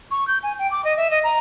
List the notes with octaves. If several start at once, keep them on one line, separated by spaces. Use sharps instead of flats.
C#6
G6
G#5
G5
D6
D#5
E5
D#5
A#5